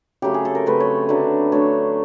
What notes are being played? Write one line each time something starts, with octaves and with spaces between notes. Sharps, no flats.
C#3 F#3 A3 C4 G4
G#4
A4
A#4
C#3 F#3 A3 C4 B4
C#5
D3 F#3 A3
D3 F#3 A3 C#5